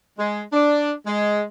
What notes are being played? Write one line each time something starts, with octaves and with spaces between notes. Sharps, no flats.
G#3
D4
G#3